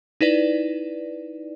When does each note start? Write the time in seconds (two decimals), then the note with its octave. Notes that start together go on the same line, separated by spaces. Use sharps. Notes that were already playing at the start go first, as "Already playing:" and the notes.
0.21 D#4 E4 B4 D5